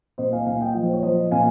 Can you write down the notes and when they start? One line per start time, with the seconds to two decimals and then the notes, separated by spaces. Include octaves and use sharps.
0.18 A#2 C5 D#5
0.32 F5 G#5
0.46 A#2 F5 G#5
0.61 D#5 G5
0.74 F3
0.83 C5
0.93 C#5
1.03 F3 C5 D#5
1.31 A#2 F5 G#5